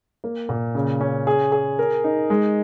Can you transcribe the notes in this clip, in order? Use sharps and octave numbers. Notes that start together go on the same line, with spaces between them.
A#3
A#2
C#3
C#4
G#4
G#4
A#4
D#4
G#3